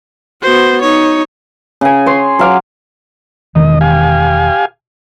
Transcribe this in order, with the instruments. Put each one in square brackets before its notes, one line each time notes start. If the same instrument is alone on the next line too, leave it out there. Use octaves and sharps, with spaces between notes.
[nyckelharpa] B3 F#4 [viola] C5
[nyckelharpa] D#4 [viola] C#5
[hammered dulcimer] C#3 G#5
C#5 C6
F#3 F5 D6
[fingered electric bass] E1 D#3 [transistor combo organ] D#5
[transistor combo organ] G4 F5 G#5